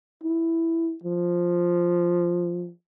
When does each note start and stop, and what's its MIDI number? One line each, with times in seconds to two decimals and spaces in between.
0.23 0.95 64
1.03 2.71 53